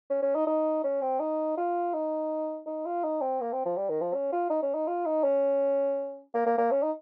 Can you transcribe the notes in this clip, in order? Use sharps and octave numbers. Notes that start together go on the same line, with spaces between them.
C#4
C#4
D#4
D#4
C#4
C4
D#4
F4
D#4
D#4
F4
D#4
C4
A#3
C4
F3
G3
D#3
F3
C#4
F4
D#4
C#4
D#4
F4
D#4
C#4
A#3
A#3
A#3
C#4
D#4